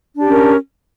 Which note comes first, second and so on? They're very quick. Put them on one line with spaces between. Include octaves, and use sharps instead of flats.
D4 G4 C#4 A#4